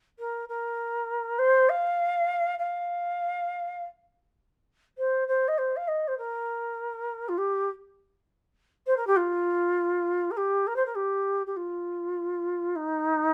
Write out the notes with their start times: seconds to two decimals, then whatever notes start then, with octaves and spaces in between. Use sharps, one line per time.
0.19 A#4
0.49 A#4
1.39 C5
1.69 F5
2.59 F5
4.98 C5
5.28 C5
5.48 D#5
5.58 C5
5.76 F5
5.88 D#5
6.08 C5
6.18 A#4
7.28 F4
7.38 G4
8.86 C5
8.97 A#4
9.07 G4
9.16 F4
10.31 A#4
10.37 G4
10.67 A#4
10.76 C5
10.86 A#4
10.96 G4
11.46 G4
11.56 F4
12.76 D#4